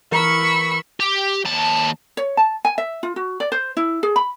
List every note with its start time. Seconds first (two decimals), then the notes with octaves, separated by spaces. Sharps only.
0.12 E3 A#4 B5 C#6 E6
1.00 G4
1.45 D#2 A5
2.17 C#5
2.37 A5
2.65 G#5
2.78 E5
3.03 F4
3.16 F#4
3.40 D5
3.52 C5
3.77 E4
4.03 G#4
4.16 B5